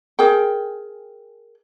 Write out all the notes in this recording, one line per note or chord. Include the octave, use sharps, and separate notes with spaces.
G#4 A#4 G5